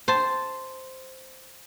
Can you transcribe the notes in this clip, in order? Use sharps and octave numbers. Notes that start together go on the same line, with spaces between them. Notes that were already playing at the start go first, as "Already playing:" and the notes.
C5 A5